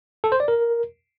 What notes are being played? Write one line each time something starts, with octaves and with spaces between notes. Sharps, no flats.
A4
C5
D5
A#4